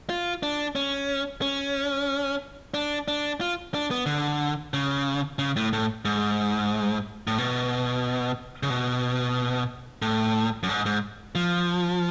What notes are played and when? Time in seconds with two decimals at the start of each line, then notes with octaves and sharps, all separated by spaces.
0.09 F4
0.43 D4
0.75 C#4
1.42 C#4
2.74 D4
3.08 D4
3.41 F4
3.74 D4
3.91 B3
4.06 D3
4.74 C#3
5.39 C#3
5.56 A2
5.73 A2
6.05 G#2
7.27 A2
7.38 B2
8.63 C#3
8.70 B2
10.02 A2
10.63 F#2
10.69 G#2
10.86 G#2
11.35 F3